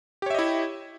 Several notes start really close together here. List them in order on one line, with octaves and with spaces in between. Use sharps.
G4 C#5 E5 D#5 E4